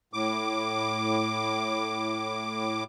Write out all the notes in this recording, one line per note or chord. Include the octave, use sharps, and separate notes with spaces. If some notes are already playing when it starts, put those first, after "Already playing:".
A2 D6